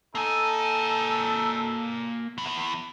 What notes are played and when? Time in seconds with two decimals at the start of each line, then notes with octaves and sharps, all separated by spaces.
0.15 A#3 D#4 A4 G#5
2.38 E2 B3